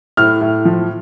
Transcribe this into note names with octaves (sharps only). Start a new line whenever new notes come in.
A2 F6
A2
F3